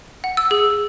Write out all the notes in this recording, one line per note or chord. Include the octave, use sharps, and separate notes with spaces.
F#5
E6
G#4